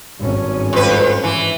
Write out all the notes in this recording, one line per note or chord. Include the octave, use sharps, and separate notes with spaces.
G#1 G2 C#4
F2 B4
E3